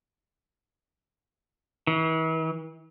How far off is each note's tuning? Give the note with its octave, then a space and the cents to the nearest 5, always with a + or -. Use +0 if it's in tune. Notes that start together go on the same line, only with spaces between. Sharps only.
E3 -40